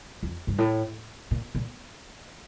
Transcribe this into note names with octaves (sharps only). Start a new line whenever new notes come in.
F2
G2
A2
A#2
A#2